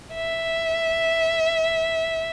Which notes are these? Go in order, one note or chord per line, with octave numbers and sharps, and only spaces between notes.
E5